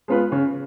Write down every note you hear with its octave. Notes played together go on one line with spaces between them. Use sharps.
G#3 B3 F4 B4
C#3